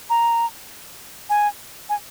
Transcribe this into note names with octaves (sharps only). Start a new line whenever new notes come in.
A#5
G#5
G#5